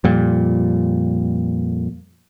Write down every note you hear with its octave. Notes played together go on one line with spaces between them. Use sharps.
F2 A#2 G3